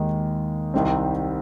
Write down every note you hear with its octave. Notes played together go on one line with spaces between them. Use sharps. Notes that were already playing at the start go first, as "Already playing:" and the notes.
Already playing: D#2 D#3 G#3
C2 C3 D#3 G3 C4